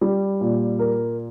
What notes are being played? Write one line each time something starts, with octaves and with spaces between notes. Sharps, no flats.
G3
A#2
A#4